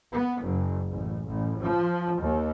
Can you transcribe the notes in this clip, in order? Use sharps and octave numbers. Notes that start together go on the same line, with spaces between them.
B3
F#1
A1
A1
F3
D#2